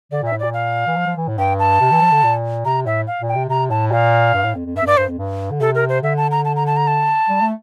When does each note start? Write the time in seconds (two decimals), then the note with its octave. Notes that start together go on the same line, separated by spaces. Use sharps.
0.12 D3 D5
0.22 A#2 E5
0.33 A2
0.39 A#2 D5
0.54 F5
0.87 E3
0.96 F3
1.07 F3
1.17 E3
1.28 A2
1.38 G2 G5
1.59 A5
1.81 C3
1.91 E3
2.02 F3
2.12 D3
2.23 A#2
2.65 C3 A#5
2.86 A2 E5
3.07 F5
3.21 A#2
3.29 G5
3.35 C3
3.49 C3 A#5
3.70 A2 A5
3.92 A#2 F5
4.34 G2
4.44 A2
4.55 F2
4.66 F2
4.76 G2 E5
4.82 F2
4.87 G2 D5
4.97 G2 C5
5.08 F2
5.18 G2
5.51 D3
5.61 C3 A4
5.75 A#4
5.89 C5
6.03 D3 E5
6.17 A5
6.31 A#5
6.45 A5
6.56 A#5
6.67 A5
6.77 A#5
6.87 A5
7.29 G3
7.41 A3